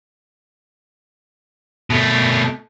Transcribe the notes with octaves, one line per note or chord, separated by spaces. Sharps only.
B2 A3